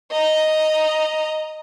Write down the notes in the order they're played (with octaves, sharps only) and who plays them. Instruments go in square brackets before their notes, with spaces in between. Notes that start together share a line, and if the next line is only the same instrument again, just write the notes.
[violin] D#5 A#5